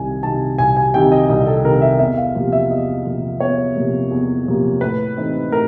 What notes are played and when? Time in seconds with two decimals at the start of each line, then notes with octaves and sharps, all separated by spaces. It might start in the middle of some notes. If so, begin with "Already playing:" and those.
Already playing: C2 C3 D#3 G#5
0.23 C3 D#3 A5
0.58 C2 G#5
0.77 G#5
0.94 C3 D#3 G5
1.12 D#5
1.29 C2 D#5
1.47 A4
1.65 C3 D#3 A#4
1.82 E5
1.99 E2 E5
2.17 F5
2.35 C3 F3 A#3
2.52 E5
2.70 E2 D#5
3.06 C3 F3 A#3
3.40 E2 C#5
3.76 C3 F3 A#3
4.11 E2
4.46 C3 F3 A#3
4.81 A2 B4
5.17 E3 A3 C4 D#4
5.51 A2 A#4